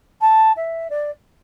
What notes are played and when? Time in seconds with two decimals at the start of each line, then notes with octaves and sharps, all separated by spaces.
0.21 A5
0.56 E5
0.90 D5